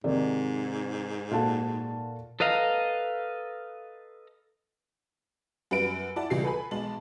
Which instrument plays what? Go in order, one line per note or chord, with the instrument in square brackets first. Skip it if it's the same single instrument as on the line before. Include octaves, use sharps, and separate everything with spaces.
[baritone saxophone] G#2 [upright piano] C3 D#3 [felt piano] A#4 D5
[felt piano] A#2 A4 A5 [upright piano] F4 F#4
[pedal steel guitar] A4 B4 D#5 F5 A#5
[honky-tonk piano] F#2 G3 F#4 B4 D7
E4 D5 F#5 A5
C#2 G3 C7
A4 B4 G#5 B5
B1 G#3 A5 F#7